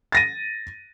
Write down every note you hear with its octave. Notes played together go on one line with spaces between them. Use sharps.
A6 A#6 D#7